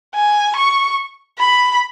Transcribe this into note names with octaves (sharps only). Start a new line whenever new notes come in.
G#5
C#6
B5